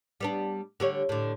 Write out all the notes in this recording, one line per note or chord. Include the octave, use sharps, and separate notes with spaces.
G3 B3 D4
D3 G3 C#5
A2 D3